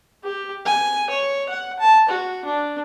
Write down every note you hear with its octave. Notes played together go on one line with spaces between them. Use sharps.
G4
G#5
C#5
F#5
A5
F#4
D4